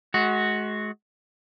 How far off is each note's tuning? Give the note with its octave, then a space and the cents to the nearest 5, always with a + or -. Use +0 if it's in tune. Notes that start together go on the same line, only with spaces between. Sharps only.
G#3 +35 F#4 +0